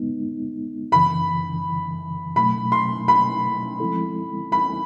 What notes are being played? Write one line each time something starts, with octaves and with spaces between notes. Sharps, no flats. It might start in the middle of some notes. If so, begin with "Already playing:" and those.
Already playing: G#3 B3 D#4
F#2 C#3 E3 B5
B2 F#3 A3 B5
C6
B5
F3 G#3 C4 E4 A4
B5